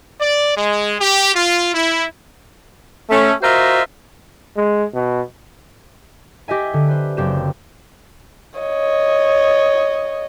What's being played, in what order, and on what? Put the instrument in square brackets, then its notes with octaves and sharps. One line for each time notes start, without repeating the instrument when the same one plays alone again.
[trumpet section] D5
G#3
G4
F4
E4
[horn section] A3 C#4
F4 F#4 A#4 C5 D#5 E5
[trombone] G#3
B2
[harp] G4 D#5 E5 G#5
D3
B4 C5
F#1 C4 G4 E7
[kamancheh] C#5 D#5